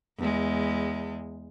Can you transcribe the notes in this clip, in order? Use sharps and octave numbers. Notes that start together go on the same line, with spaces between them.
E2 G#3